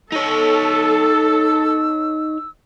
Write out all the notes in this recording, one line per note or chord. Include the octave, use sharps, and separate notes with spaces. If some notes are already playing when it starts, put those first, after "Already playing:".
D#4 A4 C#5 E6